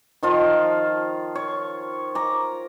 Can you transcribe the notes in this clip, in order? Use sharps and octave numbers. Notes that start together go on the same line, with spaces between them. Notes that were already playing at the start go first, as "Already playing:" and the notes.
D#3 F3 F4
C#5
A#5 D6